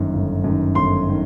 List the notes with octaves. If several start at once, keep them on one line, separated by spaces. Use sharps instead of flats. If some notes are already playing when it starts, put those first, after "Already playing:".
Already playing: G1 F#2 D#3
G1
F#2 D#3
G1 C6
D#3